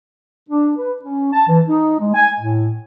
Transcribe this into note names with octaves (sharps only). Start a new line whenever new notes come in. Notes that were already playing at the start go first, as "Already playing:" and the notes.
D4
B4
C#4
A5
E3
D#4
G#3
G#5
A2